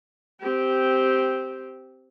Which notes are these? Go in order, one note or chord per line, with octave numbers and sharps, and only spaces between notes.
C4 G4